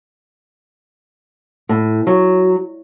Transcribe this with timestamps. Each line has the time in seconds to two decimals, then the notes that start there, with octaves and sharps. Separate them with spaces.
1.69 A2
2.07 F#3